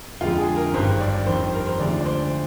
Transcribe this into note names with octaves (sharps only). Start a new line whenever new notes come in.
F2 D3 G#3 F4
G#4
A#4
G#1 G2 D#3 C5
D5
F2 D#3 G3 C5
A#4
C5
D2 D3 F3 G#3 D5
D5
C5